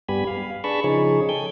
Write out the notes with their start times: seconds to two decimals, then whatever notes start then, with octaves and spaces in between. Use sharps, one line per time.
0.09 G2 G3 B3 G4 G#5 B5
0.27 F5
0.64 D4 G#4 B4 A5 B5 C#6
0.84 C#3 F3 D#4 G#4 C#5
1.29 A4 G5 G#5 G6